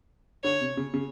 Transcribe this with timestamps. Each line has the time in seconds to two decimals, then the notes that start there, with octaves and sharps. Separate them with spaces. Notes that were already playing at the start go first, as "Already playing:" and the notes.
0.44 D3 C#5
0.61 C3
0.77 C#3
0.94 C#3